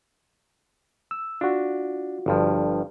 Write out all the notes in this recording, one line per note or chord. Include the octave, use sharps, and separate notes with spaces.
E6
D4 F4 F#4
G1 G2 F3